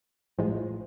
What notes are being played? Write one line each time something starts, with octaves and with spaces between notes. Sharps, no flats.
A#1 A2 F3 G#3